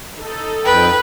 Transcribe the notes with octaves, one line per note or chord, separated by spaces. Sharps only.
D#4 A4
F2 B4 G5